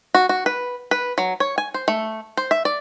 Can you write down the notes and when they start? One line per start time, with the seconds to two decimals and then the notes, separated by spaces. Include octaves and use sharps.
0.14 F#4
0.29 F#4
0.46 B4
0.91 B4
1.18 F#3
1.40 C#5
1.58 G#5
1.74 C5
1.88 A3
2.37 C5
2.51 E5
2.65 D5